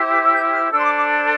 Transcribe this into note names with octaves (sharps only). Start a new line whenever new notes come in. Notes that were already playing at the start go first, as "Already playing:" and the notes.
Already playing: E4 G4 C5
D6
E6
G6
F6
D4 A4 C5 E6
C6
D6
D6